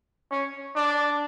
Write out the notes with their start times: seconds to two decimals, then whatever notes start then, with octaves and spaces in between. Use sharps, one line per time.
0.31 C#4
0.76 D4